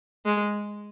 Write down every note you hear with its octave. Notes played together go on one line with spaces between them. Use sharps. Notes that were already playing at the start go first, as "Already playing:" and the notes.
G#3